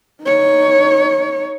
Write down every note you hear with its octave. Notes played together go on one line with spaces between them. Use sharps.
D#4 C#5